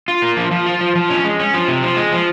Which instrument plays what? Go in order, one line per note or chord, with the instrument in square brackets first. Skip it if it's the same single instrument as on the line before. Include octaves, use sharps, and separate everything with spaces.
[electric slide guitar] F4
A#3
F3
F3
F4
F3
F3
C#4
G#3
C#4
F3
C3
F3
G#3
F3